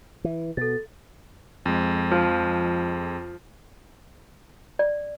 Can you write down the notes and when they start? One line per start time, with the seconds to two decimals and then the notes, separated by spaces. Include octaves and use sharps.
0.24 E3
0.57 B2 A4 A6
1.66 F2 G#3
2.11 F3
4.79 D5